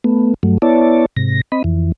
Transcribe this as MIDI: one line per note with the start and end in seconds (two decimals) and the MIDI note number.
0.04 0.34 57
0.04 0.34 59
0.43 0.58 43
0.43 0.58 54
0.43 0.58 57
0.62 1.06 59
0.62 1.06 64
0.62 1.06 73
0.62 1.06 74
0.62 1.06 81
1.17 1.41 44
1.17 1.41 48
1.17 1.41 94
1.52 1.63 60
1.52 1.63 75
1.52 1.63 83
1.64 1.92 41
1.64 1.92 52